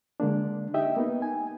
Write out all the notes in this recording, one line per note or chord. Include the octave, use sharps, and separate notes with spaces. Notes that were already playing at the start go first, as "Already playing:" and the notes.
D3 G#3 A#3 D4
D#4 G4 D#5 E5 G5
A#3 B3 D#4
G#5